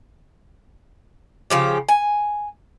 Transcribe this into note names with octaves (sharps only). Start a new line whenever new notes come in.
C#3 F3 G4
G#5